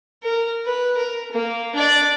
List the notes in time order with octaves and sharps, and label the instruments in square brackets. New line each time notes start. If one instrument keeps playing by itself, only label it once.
[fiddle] A#4
B4
A#4
A#3
D4 D5